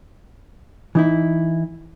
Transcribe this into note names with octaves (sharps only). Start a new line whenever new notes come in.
E3 D#4 E4